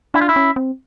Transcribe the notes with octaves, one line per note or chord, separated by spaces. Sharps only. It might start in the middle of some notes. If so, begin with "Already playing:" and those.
D4 E4
F4
E4
C#4
C4